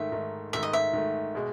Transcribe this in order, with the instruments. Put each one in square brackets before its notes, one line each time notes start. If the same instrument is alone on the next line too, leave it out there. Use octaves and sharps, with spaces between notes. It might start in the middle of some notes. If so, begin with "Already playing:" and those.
Already playing: [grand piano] G#2 D#3 A3 [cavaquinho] E5
[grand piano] G#2 D#3 A3
[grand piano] G#2 D#3 A3 [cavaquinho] E5
[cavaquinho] D#5
E5
[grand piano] G#2 D#3 A3
B2 G#3